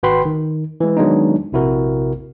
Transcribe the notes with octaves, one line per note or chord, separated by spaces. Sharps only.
G#1 F#4 B4 G5 B5 C6
D#3
E3 G#3
D#3 F#3 G#3 B3 D4 D#4
A#1 C3 E4 F#4 A#4